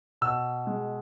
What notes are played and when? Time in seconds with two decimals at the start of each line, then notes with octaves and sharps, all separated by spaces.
0.21 B2 E6
0.67 G#3